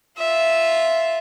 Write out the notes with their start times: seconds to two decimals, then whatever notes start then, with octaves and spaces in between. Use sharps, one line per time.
0.18 F4 E5